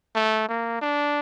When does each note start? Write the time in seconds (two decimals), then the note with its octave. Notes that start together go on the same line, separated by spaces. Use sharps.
0.15 A3
0.48 A#3
0.82 D4